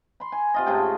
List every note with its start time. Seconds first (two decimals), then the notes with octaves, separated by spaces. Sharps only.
0.20 B5 C6
0.32 G#5
0.54 C3 F4 D#5
0.66 G#2 C#3 A3 G5